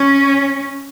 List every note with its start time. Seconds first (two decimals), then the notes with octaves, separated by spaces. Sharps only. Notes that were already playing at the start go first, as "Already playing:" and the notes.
Already playing: C#4